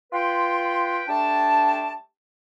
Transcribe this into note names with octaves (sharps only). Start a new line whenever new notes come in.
F4 B4 G5 C6
G3 A3 D4 G5 A5